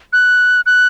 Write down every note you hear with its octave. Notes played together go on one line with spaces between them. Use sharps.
F#6
F#6